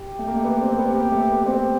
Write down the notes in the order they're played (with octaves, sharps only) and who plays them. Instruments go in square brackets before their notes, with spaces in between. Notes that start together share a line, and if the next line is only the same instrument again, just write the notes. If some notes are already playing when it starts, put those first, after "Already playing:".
Already playing: [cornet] G4
[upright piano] A3
A#3
A3
B3
C4
B3
[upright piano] A#3 [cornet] G4
[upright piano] A3
B3
[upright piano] C4 [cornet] G4